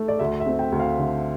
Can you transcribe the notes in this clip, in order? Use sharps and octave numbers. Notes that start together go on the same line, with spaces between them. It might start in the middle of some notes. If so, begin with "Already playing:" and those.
Already playing: A3
D5
D2 E5
E5
C4
G5
D2
F5
D3